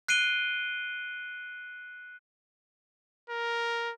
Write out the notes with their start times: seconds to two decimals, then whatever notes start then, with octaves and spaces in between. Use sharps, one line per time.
0.08 F#6 C7 D7 D#7 G7
3.30 A#4